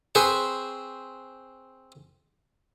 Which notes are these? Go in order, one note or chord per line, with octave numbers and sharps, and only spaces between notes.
C4 G#4 B4 C5 C#6